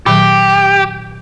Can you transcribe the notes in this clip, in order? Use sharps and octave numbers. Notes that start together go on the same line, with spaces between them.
A#2 D#3 F#3 G4